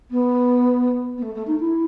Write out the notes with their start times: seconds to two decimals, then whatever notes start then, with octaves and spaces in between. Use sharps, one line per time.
0.11 B3
1.17 B3
1.22 A3
1.35 A3
1.47 D#4
1.60 E4